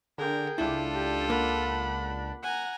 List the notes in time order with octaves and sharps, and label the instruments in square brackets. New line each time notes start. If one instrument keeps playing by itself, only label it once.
[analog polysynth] D3 [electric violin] G#4 G5 [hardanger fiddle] A#4
[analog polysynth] C#2 D4 [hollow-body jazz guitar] E4 [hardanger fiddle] F4 A4
[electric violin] G4
[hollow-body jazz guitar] A#3 [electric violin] F#5 B5
[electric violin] F#5 [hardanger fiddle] G#5 A#5